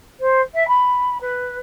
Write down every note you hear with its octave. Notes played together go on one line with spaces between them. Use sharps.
C5
E5
B5
B4